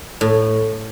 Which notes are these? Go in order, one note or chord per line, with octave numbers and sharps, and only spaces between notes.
A2